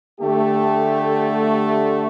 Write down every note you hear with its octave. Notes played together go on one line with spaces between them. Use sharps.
D3 A3 G4